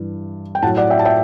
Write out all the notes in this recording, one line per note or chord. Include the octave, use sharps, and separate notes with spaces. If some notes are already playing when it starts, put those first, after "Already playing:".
Already playing: G2 E3
G5
A2 F#3 F#5 A5
D5 F#5
E5 G5
A5
E5 G5